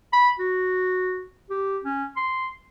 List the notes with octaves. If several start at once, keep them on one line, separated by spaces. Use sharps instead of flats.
B5
F#4
G4
C#4
C6